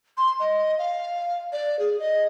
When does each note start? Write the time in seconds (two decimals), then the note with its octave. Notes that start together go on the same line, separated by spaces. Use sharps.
0.17 C6
0.40 D#5
0.78 F5
1.52 D5
1.79 G#4
1.99 D#5